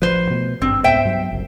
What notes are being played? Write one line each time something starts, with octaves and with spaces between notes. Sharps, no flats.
A1 F3 B4 C5
B2 A3
G#1 G2 C4 D4
C2 G#2 B3 C5 E5 G5
G2 F#3 B3
F#1 C2